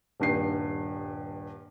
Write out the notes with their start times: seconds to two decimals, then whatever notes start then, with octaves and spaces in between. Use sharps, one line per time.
0.20 D#1 G2 C7